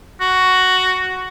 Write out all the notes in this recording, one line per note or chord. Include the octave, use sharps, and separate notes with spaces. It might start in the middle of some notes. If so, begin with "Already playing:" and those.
F#4